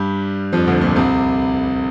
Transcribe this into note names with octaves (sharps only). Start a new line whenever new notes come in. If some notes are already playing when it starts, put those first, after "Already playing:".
Already playing: G2 G3
F2 F3
D2 D3
A#2
C2 C3